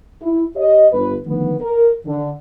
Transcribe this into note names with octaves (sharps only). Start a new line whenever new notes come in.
E4
G4 C#5 D#5
G1 B4
D3 D#3 F3 A3 B3
A#4
D3